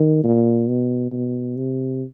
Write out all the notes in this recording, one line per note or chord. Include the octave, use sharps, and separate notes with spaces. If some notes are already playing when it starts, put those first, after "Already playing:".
Already playing: D#3
A#2
B2
B2
C3